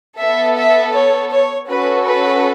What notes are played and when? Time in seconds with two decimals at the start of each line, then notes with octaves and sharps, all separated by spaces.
0.19 B3 A4 E5
0.56 E5
0.94 C#5
1.31 C#5
1.69 C#4 F#4 A4 B4
2.06 B4